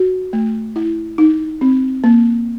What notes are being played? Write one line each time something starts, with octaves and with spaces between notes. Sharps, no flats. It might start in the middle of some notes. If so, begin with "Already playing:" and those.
Already playing: F#4
A3
E4
D#4
C4
A#3